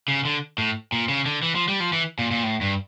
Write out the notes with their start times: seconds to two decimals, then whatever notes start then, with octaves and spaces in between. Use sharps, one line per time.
0.08 C#3
0.25 D3
0.58 A2
0.92 A#2
1.09 C#3
1.26 D3
1.43 E3
1.55 F3
1.68 G3
1.80 F3
1.93 E3
2.19 A#2
2.31 A#2
2.43 A2
2.61 G2